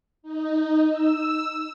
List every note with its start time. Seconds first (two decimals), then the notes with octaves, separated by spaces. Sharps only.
0.23 D#4
0.90 E6